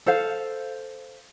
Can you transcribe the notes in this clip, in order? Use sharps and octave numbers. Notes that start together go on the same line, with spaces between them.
A4 C5 F5